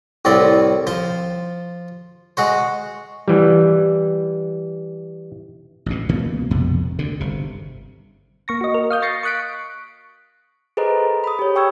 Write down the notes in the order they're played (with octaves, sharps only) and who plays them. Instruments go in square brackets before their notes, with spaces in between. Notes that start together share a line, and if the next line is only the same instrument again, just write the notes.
[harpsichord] C2 A2 C4 D5 C6
F3 C5 C6
G#3 F#4 C5
[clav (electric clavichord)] E3 G3
[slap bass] A1 D2 B2
C#2 B2 E3 A#3
A#1 F2 C3 B3
D2 D3
G1 C3
[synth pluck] A#3 C#6 A#6
F#4 D#5
A#4
F5 D#6 G6
C#6 A6 A#6 C7 C#7
C#6 D#6 F#6 B6 D7
[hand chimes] G#4 A4 B4 C5 D#5 A#5
B5 D#6
G4 C#5
G5 C#6 E6 G#6